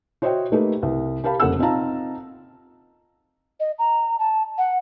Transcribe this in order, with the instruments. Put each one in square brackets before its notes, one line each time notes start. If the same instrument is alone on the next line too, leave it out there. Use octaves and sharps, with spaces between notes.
[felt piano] F#4 C5 C#5 D#5 E5 G5
A3 A#3 D#4 G4 A4 B4
C2
G4 A#4 F5 A5 B5
F1 A#3 C#4 A4 F#5 E6
C4 D#4 F4 F5 A5 A#5
[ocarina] D#5
A#5
A5
F#5